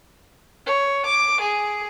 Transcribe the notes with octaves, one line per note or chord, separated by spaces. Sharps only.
C#5
D6
G#4